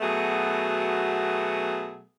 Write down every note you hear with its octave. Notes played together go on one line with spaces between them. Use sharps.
B2 F#3 A3 B3 F#4 G#4